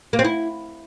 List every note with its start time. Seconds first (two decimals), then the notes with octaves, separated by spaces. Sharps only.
0.13 A#3
0.19 C4
0.25 E4